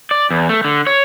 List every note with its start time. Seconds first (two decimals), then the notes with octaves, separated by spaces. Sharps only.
0.11 D5
0.31 E2
0.49 A3
0.65 D3
0.87 C#5